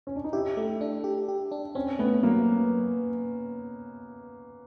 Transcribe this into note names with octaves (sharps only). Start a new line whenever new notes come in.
C#4
D4
D#4
E4 G4
A3
D4
G4
G4
D4
C4 C#4
A3 B3
F#3 A#3